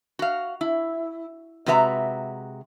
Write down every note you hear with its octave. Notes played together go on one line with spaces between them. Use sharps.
F#4 F5
E4
C3 G#3 F#4 B4 E5 A#5